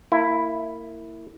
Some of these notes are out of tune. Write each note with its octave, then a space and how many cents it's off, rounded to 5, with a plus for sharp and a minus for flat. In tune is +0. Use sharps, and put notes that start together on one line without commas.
A#3 -25 E4 +0